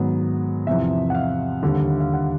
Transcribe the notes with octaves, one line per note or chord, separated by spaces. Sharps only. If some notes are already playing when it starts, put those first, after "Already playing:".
Already playing: G#2 D#3 F#3 B3
E2 C3 F3 E5
F#5
F5
D#2 D3 G3
F5
F#5